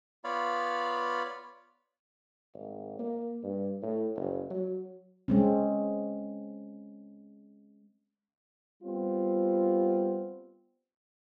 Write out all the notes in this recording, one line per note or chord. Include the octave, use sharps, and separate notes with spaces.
B3 F4 C#5 D5 F5 B5
G#1
A#3
G2
A2
F#1
F#3
G#3 C4 C#4
G3 B3 C4 F4